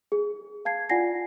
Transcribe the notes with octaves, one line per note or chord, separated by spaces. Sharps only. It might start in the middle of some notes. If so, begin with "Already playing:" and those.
G#4
F5 A5 G#6 C7
F4 D5 F#5 G#5 A#6 C7